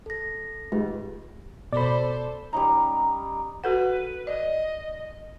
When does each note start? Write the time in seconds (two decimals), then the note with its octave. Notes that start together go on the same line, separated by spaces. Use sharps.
0.06 A4 A#6
0.72 G#2 F4 G4 B4
1.72 B2 A4 C5 D5 B5
2.53 G3 C#4 D#4 A#5
3.64 F#4 A4 B4 F#5
4.27 D5 D#5